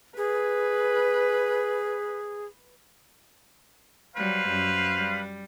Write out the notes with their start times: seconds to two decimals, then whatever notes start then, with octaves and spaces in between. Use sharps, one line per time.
0.17 G#4 B4
4.16 F#3 G3 B4 C5 F5
4.48 F#2
4.95 G3